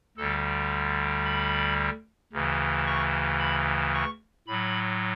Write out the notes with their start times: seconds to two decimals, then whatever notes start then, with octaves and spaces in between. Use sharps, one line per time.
0.18 D2 D3 G3 A4
1.25 B5
2.33 D2 C#3 E3
2.87 C#6
3.39 B5
3.94 C#6
4.47 A2 F#3 B5